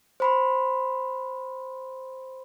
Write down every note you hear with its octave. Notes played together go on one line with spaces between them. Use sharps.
C5 B5 C6